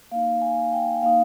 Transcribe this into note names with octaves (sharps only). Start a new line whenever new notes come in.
A#3 D#4 F5
G#5
G5
A#3 D#4 F5